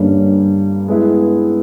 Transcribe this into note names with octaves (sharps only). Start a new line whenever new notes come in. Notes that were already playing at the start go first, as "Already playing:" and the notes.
Already playing: G2 D3 G3 A#3 C#4
G#3 B3 E4